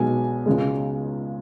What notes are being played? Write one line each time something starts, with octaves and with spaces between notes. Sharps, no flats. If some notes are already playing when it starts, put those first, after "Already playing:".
Already playing: B1 B2 G#3 G#5
C#2 C#3 G#3